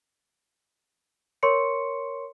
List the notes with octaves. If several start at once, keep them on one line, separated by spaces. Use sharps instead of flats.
A#4 C#5 C6 C#6 C#7